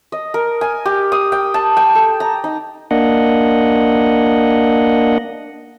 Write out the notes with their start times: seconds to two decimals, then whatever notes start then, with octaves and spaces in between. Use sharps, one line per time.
0.12 D#5
0.34 A#4
0.61 G#5
0.86 G4
1.12 D#6
1.32 G5
1.54 A5
1.77 G5
1.95 A4
2.20 A#5
2.44 D#4
2.91 A#3 D4 D#5 F#5